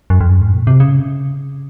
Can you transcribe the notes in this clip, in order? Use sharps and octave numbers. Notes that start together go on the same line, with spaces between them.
F#2
F2
F#2
G#2
A#2
C3
C#3